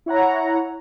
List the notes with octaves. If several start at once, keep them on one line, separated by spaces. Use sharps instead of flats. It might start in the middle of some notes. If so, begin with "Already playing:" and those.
E4 C#5 F#5 A#5